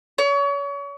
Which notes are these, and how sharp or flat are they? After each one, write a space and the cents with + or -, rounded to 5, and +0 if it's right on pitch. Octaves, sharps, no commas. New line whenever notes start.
C#5 +35